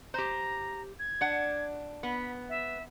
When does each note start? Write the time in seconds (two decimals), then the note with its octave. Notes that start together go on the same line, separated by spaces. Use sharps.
0.14 G4 C5 A#5
0.99 G#6
1.21 D4 F#5
2.03 B3 B5
2.49 E5